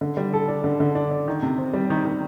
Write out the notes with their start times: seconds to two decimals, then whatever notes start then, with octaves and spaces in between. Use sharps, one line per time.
0.01 D3
0.17 G3
0.33 A4
0.48 D4
0.64 D3
0.80 D3
0.95 D4
1.11 D4
1.28 D#3
1.43 C3
1.58 C4
1.74 G3
1.90 D#3
2.05 D#3